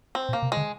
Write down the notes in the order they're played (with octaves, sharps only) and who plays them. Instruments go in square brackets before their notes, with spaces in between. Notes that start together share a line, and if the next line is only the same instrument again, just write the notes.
[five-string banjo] C4
[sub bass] A#2
[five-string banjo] A#3
[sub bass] C3
[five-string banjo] G#3
[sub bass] D3